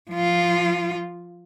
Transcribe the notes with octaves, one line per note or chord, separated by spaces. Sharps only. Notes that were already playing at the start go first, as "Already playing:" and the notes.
F3 F4